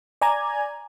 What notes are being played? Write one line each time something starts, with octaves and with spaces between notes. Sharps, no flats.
D5 G#5 A#5 G#6